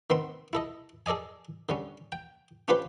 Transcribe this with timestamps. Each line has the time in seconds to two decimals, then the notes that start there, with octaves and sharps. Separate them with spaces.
0.10 D#3 B3 C4 C6
0.53 E4 A4 D#5
1.06 G#4 A4 D5 D#5 G#5
1.69 D3 G3 C#4
2.12 G5
2.68 C#4 D4 F4 G4 B4 C5